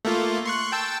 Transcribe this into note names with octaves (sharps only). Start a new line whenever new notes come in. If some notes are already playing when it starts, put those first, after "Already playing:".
A3 A#3 F4
C6 C#6 F#6
G5 A5 E6